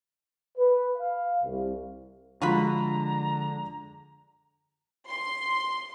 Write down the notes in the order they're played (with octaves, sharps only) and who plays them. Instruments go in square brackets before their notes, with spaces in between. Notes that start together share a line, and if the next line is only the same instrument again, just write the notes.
[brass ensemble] B4
F5
C2
[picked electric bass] D3 [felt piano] F3 G#3 [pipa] F4 F#4 B5 [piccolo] A#5
[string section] C6